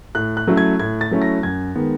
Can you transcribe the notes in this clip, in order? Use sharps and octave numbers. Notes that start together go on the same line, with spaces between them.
A2 F#6
F#6
F#3 A3 C#4 E4
G#6
A2 G#6
A6
F#3 A3 C#4 E4
A#6
F#2 G#6
D#3 G#3 B3